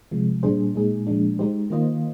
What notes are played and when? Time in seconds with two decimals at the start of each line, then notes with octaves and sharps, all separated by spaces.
0.11 C3 F3 G#3
0.43 A#2 G3 D4 G#4 C5
0.75 A#2 G#3 D#4 G#4
1.07 A#2 F3 G#3 D4
1.39 G#3 D#4 G4 C5
1.70 D#3 A#3 F4 C5 D#5